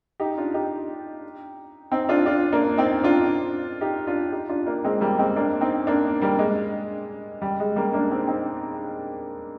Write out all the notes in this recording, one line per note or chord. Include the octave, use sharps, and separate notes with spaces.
D#4 G4
D4 F4
D#4 G4
C4 D#4
D4 F4
D4 F4
A#3 D4
C4 D#4
D4 F4
D#4 G4
D4 F4
D#4 G4
D4 F4
A#3 D4
G#3 C4
G3 A#3
G#3 C4
A#3 D4
C4 D#4
A#3 D4
G3 A#3
G#3
G3
G#3
G3 A#3
A#3 D4
C4 D#4
C4 D#4